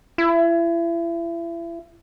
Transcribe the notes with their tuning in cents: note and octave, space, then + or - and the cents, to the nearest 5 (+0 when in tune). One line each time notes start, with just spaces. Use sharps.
E4 +35